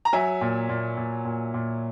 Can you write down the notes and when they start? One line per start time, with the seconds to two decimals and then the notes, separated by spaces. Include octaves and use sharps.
0.05 A#5
0.13 F#3 E5 G#5
0.41 A#2
0.69 A#2
0.97 A#2
1.25 A#2
1.54 A#2